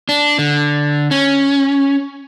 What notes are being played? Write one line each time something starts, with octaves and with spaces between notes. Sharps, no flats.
D4
D3
C#4